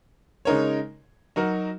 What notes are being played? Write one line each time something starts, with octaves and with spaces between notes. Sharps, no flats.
C#3 G#3 D#4 A#4 C#5
F#3 D#4 F#4 A#4